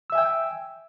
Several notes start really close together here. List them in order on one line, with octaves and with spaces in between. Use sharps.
E6 E5 G#5 G5